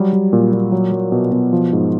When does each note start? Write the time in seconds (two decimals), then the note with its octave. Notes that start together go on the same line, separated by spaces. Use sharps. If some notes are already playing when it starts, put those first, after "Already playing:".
Already playing: F#3 G3
0.13 G3
0.33 A#2
0.53 A#2
0.72 F#3
0.92 F#3
1.12 B2
1.32 B2
1.53 F3
1.73 G#2